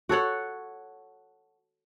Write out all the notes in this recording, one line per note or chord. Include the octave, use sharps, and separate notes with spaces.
F#4 A4 C#5 F#5